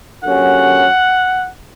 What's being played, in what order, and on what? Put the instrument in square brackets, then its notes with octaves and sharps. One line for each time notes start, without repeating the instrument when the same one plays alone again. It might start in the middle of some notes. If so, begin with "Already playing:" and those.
[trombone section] D3 F#3 A#3 C#4 G4 [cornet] F#5